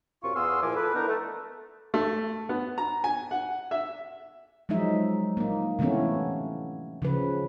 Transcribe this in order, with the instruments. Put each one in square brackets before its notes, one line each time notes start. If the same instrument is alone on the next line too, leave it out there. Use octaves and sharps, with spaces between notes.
[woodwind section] F#2 C3 F4 C#6
E2 B3 G#4 F5 C6 E6
A#2 E3 F3 G#5 D6
A4 B4
E3 B3 D4 D#4 A#4
A3
[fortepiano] A3
B3
A#5
G#5
F#5
E5
[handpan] F3 F#3 G#3 D#4 E5
A#3 D#4
C3 E3 A3 B3 C#4
C#3 F3 B4